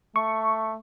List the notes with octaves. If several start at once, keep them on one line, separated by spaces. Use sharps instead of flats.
A3 C#6